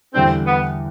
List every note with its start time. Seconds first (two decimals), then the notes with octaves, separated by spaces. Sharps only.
0.14 E2 D3 G3 C4 D4
0.47 B3